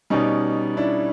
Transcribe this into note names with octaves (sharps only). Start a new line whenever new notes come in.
B2 G3 C#4 D#4
D4 E4